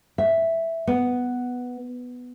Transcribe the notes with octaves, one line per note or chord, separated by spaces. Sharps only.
E5
B3